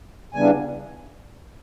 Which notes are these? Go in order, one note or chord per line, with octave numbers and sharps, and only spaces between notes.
C#3 E3 G3 B3 D4 G#5